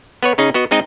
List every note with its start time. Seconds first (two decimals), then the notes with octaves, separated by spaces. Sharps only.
0.23 B3 B4 C#5
0.38 C#3 C#4 D#4 G#4
0.54 B3 F#4 D#5
0.71 G#3 C4 D#4 D#5